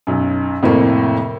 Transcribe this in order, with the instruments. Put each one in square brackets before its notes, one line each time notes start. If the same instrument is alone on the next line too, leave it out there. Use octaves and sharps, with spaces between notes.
[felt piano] B1 F#2
F2 A2 C3 A#3 E4